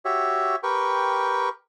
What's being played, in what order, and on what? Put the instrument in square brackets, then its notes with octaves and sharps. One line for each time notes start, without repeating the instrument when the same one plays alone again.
[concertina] F#4 G4 C#5 E5
G4 A#4 B4 G5 C#6